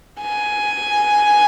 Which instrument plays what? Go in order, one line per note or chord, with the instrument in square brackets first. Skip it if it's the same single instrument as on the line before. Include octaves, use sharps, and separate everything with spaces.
[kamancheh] G#5